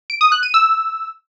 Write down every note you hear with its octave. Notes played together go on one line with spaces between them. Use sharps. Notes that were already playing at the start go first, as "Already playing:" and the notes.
D7
D#6
F#6
D#7
E6